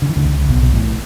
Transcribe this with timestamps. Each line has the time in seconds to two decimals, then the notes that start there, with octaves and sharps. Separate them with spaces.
0.02 D3
0.09 E3
0.16 D2 D3
0.25 C#2 C#3
0.49 B1 B2
0.62 B2
0.73 A1 A2